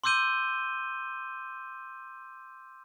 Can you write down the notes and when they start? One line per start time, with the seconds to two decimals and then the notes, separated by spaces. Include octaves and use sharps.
0.04 C6 D6 E6 G6 D#7 G7